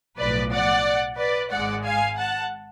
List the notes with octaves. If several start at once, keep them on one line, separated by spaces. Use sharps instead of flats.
B1 A2 F3 B4 D5
D5 F#5
B4 D5
G#1 G#2 G#3 D5 F#5
F5 G#5
F#5 A5